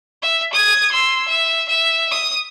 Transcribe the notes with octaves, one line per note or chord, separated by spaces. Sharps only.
E5
D#6 G#6
C6 E6
E5
E5
D#6